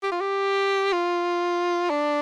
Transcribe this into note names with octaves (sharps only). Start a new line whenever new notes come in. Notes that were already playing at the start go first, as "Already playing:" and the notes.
G4
F4
G4
F4
D4